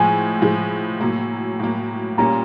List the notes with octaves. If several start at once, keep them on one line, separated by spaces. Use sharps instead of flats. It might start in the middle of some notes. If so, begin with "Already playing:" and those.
Already playing: A2 F3 G#3 G#5
A2 F3 G#3
A2 F#3 A#3
A2 F#3 A#3
A#2 G3 A#3 C#4 A#5